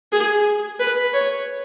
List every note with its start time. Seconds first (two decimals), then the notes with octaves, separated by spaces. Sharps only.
0.12 G#4
0.79 B4
1.13 C#5